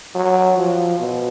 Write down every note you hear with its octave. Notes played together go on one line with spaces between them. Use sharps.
F#3
F3
B2